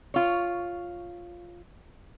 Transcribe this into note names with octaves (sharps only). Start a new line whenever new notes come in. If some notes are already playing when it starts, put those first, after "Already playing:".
F4 C#5